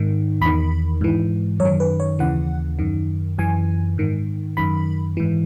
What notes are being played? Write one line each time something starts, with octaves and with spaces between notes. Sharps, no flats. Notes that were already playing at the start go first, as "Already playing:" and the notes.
Already playing: G#2 D#3
E2 D#3 B5
G#2 E3
F#2 C#5
D#3
B4
C#5
D#2 C#3 E3 F#5
F#2 D#3
F#2 E3 G#5
G#2 D#3
F#2 D#3 B5
G#2 E3